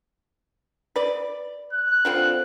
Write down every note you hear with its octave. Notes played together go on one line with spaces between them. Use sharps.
B4 D5
F#6
D3 F3 C4